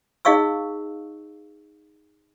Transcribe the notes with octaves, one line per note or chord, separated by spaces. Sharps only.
D#4 G#4 D#5 F5 C#6 E6